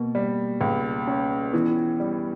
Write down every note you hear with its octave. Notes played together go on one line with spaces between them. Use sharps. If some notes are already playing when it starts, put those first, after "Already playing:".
Already playing: B2 A#3
G3
C#2
C#4
E3 B3
G3